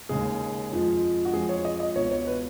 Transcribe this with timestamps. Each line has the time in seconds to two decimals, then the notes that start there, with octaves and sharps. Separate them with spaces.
0.09 D#2 C#3 G#3 G#4
0.72 F2 F3 G#3
1.25 F#4
1.33 F2 F3 G#3 G#4
1.49 C#5
1.65 D#5
1.80 D#5
1.96 C#2 B2 G#3 C#5
2.11 C#5
2.27 B4